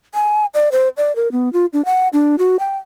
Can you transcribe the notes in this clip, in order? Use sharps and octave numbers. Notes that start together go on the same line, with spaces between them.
G#5
D5
C5
D5
A#4
B3
F4
D4
F#5
D4
F#4
G5